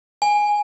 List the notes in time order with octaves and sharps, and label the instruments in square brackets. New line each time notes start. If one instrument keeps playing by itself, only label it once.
[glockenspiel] G#5